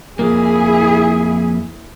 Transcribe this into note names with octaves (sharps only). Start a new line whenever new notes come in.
F2 A#3 E4 G#4